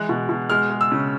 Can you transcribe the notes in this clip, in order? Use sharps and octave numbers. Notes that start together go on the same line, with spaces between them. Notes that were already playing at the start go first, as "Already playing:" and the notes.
Already playing: E3 G#3 F#6
B2
B2
G#3 F6
G#3
E6
C#3